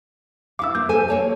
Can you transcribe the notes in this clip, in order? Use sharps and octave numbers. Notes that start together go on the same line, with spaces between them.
E4 F5 D6 E6
A#3 G6
A4 C5 G#5
A#3 C#5 A5